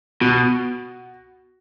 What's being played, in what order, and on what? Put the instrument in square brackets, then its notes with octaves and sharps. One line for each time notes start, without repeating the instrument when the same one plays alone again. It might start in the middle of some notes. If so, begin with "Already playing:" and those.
[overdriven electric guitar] B2 [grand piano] F#4